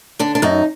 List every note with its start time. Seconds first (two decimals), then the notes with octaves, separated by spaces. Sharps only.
0.19 D3 D4
0.35 D4
0.42 F#2 D#4